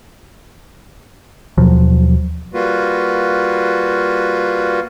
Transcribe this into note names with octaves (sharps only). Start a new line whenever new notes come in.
D#2 B2 F3 F#3
G3 A#3 F4 F#4 B4